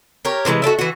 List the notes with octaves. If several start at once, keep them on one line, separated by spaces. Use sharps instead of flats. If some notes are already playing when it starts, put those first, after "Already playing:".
G4 A#4 C#5
C3 E3 G3 G#3
F#4 A4 D5 E5
E3 F#4